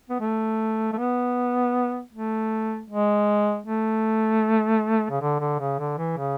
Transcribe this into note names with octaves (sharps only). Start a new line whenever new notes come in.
B3
A3
A3
B3
A3
G#3
A3
C#3
D3
D3
C#3
D3
E3
C#3